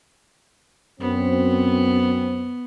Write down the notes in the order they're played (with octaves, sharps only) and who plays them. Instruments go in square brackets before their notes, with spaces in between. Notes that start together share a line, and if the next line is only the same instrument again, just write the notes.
[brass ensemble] F#2 C4 [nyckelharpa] B3